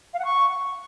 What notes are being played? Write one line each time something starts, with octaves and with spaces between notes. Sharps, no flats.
F5
F#5
C#6